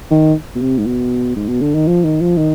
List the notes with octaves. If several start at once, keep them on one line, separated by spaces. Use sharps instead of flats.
D#3
B2
C3
G#2
B2
G#2
B2
D3
D#3
F3
D#3
F3
D#3